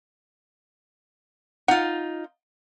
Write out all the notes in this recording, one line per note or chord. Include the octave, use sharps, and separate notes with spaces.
D#4 F4 F#5